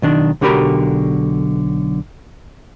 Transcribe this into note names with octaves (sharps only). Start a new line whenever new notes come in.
B1 D#3 D4
B1 D3 F#4 G4 A#4 B5